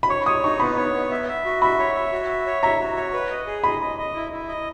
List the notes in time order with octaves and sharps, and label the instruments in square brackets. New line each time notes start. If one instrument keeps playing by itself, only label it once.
[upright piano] B5
[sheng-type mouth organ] C#5 [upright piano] C#6
[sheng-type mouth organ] C#5 [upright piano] D#6
[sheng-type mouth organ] D#4 [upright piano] C#6
[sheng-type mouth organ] B3 [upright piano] B5
[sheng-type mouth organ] C#5
B3
E5
E5
F#4
[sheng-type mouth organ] E5 [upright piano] B5
[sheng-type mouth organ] C#5
E5
F#4
E5
C#5
[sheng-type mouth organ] E5 [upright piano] A#5
[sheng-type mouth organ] F#4
C#5
B4
D#5
G#4
[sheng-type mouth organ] D#5 [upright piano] B5
[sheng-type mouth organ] D#5
D#5
E4
E4
D#5